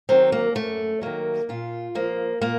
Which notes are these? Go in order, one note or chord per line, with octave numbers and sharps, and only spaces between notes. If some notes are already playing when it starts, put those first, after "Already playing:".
D#3 F#3 C4
A#3
F#2 A3
D#3 F#3 A#3
A#2 F4
F3 A#3
A#2 A#3